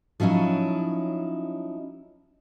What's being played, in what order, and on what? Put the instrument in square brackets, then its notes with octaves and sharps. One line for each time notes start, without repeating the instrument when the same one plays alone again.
[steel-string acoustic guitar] F3 F#3 C#4 D#4 E4